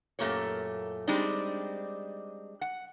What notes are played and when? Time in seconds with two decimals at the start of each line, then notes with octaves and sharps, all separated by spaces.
0.19 F#2 A#2 A3 A#3 G4 C#5
1.07 G3 G#3 C4 D4 D#4
2.61 F#5